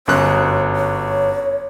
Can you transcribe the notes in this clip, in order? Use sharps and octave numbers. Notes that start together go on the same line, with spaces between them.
G1 F#2 C#5 F#6
C#5